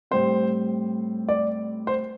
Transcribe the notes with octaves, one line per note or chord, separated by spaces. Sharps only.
A2 G3 C4 C5
D5
C5